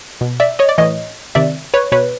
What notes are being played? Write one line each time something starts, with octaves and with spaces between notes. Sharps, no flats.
B2
D5 E5
C#5 D#5
D5
A2 E3 C#5 D#5
C3 D#3 D5 E5
B4 C#5
B2 B4 C#5